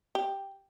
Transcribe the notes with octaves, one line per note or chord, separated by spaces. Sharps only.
G4